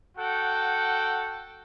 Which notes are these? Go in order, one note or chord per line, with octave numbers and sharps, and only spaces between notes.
F#4 A4 F#5 G5